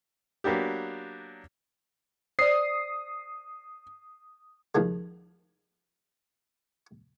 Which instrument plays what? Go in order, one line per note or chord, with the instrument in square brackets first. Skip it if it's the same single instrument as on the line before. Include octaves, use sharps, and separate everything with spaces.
[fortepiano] F#3 A#3 B3 D4 G4
[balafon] C5 D5 [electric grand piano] D#6 C7
[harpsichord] D#2 D#3 F3 G#3